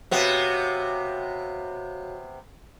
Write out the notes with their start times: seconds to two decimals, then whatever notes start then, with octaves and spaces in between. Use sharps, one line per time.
0.11 C3 B3 F#4 C#5 F5